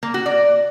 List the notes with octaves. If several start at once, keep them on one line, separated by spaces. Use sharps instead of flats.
A#3
F#4
D5